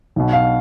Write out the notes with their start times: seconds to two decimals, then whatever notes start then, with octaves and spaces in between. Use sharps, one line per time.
0.16 B1 B2
0.33 F5